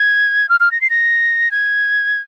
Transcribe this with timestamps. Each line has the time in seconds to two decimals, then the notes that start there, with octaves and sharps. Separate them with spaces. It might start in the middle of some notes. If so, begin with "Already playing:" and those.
Already playing: G#6
0.49 F6
0.60 F6
0.71 A#6
0.81 C7
0.90 A#6
1.51 G#6